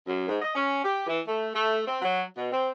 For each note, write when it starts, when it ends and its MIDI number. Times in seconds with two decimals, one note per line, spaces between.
0.07 0.28 42
0.29 0.40 44
0.42 0.54 75
0.55 0.83 61
0.84 1.06 67
1.07 1.20 52
1.28 1.48 57
1.55 1.81 57
1.88 1.99 60
2.02 2.23 54
2.37 2.52 47
2.52 2.69 60